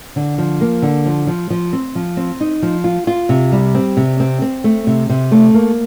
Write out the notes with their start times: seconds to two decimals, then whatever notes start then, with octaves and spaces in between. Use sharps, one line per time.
0.16 D3
0.38 F3
0.61 A#3
0.82 D3
1.06 F3
1.27 F3
1.50 F3
1.73 C4
1.95 F3
2.17 C4
2.40 D#4
2.63 F3
2.84 F4
3.07 F4
3.29 C3
3.52 G3
3.75 C4
3.97 C3
4.20 C4
4.42 C4
4.64 A3
4.87 C3
5.09 C3
5.31 A3
5.54 A#3